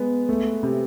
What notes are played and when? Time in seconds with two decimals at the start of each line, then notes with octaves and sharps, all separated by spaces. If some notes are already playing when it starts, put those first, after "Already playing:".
Already playing: G#3 B3
0.29 A3
0.63 C3